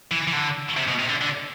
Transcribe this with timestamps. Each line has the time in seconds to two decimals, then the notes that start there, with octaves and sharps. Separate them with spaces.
0.11 E3
0.27 E3
0.33 D3
0.77 C3
0.88 B2
0.99 C3
1.09 D3
1.21 D3